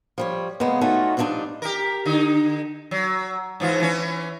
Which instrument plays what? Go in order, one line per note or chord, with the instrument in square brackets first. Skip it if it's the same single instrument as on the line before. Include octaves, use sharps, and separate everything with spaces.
[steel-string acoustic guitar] F3 G3 C#5
C#3 G#3 A#3 B3
A3 C#4 D#4 F4 F#4 A4
G2 F3 G3 C4 D4 D#4
[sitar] G4 A#4
D3 D#4
F#3
G#2 E3 F4
E3 C#4